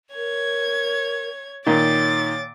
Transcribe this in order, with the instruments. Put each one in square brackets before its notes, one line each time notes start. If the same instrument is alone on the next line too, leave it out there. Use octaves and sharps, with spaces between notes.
[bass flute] A#4 [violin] C#5 G#6
[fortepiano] A#2 D#3 [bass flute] C#5 [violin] D6 A6